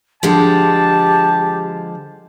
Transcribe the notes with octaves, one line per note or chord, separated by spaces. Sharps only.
D3 F3 G#3 G4 A5